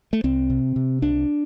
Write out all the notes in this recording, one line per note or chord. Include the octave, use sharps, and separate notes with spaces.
A3
C2 C4
C3
C3
C2 D4